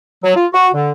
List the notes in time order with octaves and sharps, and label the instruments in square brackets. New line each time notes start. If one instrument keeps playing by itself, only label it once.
[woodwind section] F#3
F4
F#4
D3